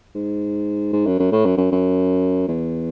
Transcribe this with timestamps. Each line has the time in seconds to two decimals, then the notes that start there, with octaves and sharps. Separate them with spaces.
0.15 G#2
0.93 G#2
1.06 F#2
1.19 F#2
1.32 A2
1.45 F#2
1.57 F#2
1.71 F#2
2.48 E2